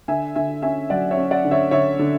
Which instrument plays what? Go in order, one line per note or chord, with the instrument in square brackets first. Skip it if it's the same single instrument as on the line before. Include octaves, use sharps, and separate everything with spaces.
[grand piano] D3 E5 G#5
D3 E5 G#5
C#4 E5 G#5
F#3 D5 F#5
C#5 E5
C#4
D5 F#5
D3
C#5 E5
D3 C#5 E5
D3